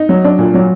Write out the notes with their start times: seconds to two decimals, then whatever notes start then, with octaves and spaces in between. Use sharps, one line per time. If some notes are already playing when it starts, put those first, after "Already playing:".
Already playing: D#4
0.09 F#3
0.24 D4
0.39 A#2
0.54 F#3